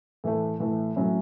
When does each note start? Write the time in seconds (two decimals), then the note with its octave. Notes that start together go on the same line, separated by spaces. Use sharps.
0.24 A2 E3 A3
0.60 A2 E3 A3
0.96 A2 F#3 C#4 E4